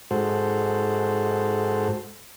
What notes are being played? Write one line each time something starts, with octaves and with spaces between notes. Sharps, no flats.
G#2 F#4 A4 C5